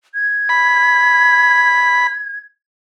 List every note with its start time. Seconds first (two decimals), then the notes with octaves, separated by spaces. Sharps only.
0.14 G#6
0.49 B5